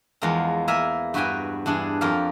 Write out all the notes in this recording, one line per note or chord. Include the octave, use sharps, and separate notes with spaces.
E2 F3 G#3 A#4 A#5
A#3 A#4 E5 G#5 A#5
G2 F#4 B4 G5 G#5 A#5
G2 E3 D4 G#4
F2 G4 A#4 F5